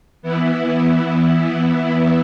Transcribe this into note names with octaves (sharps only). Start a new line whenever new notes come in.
E3 B3 E4